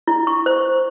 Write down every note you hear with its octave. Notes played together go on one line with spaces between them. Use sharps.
E4
C#6
C5